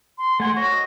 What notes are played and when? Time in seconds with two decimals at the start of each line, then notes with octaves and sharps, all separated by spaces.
0.18 C6
0.40 A3 F#5 G#5 C6
0.56 F#4 C#5 C#6 A#6
0.72 D#5